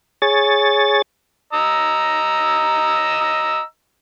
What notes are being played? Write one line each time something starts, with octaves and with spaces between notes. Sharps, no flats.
G#4 C#5 A6
D#5 A#5 E6